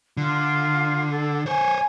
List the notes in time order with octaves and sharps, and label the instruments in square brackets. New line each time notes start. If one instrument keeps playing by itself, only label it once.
[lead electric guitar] D3 [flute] F4
[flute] A4
[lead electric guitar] C5 C#5 [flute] G#5